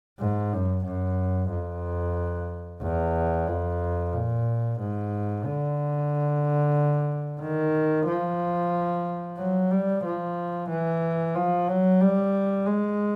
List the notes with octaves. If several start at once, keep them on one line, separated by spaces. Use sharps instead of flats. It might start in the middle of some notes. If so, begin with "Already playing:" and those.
G#2
F#2
F#2
F2
E2
F2
A#2
G#2
D3
D#3
F3
F#3
G3
F3
E3
F3
F#3
G3
G#3